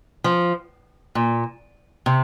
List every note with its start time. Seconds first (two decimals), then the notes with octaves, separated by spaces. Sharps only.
0.24 F3
1.15 A#2
2.06 C3